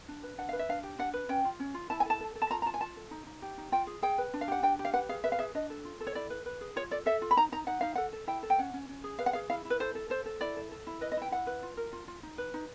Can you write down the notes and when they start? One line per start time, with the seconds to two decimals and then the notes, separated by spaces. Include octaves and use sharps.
0.08 D4
0.23 B4
0.38 D4 F#5
0.49 B4 F5
0.59 E5
0.69 D4 F5
0.83 G4
0.99 D4 F#5
1.13 B4
1.29 C#4 G5
1.45 F4
1.60 C#4
1.74 F4
1.90 E4 A5
2.00 G#5
2.06 A4 A5
2.20 A4
2.35 A4
2.42 A5
2.50 F4 A#5
2.62 A#5
2.66 F4 A5
2.74 G#5
2.81 F4 A5
2.97 A4
3.11 D#4
3.27 D#4
3.42 G4
3.58 D#4
3.72 F4 G5
3.87 G#4
4.02 G#4 G5
4.18 B4
4.34 D4
4.41 F5
4.48 G4 F#5
4.63 D4 G5
4.79 G4
4.85 F5
4.93 B4 F#5
5.09 G#4 F5
5.24 B4 E5
5.32 F5
5.39 G#4 E5
5.55 D4 D#5
5.70 A4
5.85 F4
6.01 A4
6.07 C#5
6.15 E4 D5
6.30 B4
6.46 B4
6.61 G#4
6.76 F4 C#5
6.91 A4 D5
7.06 A4 E5
7.22 F4
7.31 B5
7.37 D#4 A#5
7.52 D#4 A#5
7.67 D#4 F#5
7.81 D#4 F5
7.95 A4 F#5
8.13 A4
8.27 E4 G5
8.43 A4
8.50 G5
8.58 C#4 F#5
8.73 C#4
8.89 C#4
9.04 G#4
9.19 B4 F5
9.26 F#5
9.33 G#4 F5
9.50 E4 F5
9.65 E4
9.70 B4
9.80 A4 C5
9.95 A4
10.10 A4 C5
10.26 A4
10.41 E4 D5
10.56 A4
10.72 A4
10.87 E4
11.01 B4 D#5
11.12 D#5
11.17 E4 G5
11.31 E4 F#5
11.47 B4
11.63 F4
11.77 A#4
11.93 F4
12.08 F4
12.23 D#4
12.38 B4
12.54 D#4